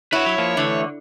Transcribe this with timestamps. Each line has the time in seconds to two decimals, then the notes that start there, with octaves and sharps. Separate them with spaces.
0.13 E4 F#4 B4 C#5
0.26 F#3
0.38 F3 A#3
0.57 D3 E3 A3